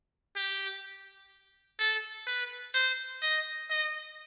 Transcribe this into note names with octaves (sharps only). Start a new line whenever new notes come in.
G4
A4
B4
C5
D#5
D#5